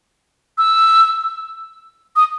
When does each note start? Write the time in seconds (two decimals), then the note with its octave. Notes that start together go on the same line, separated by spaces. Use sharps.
0.58 E6
2.16 D#6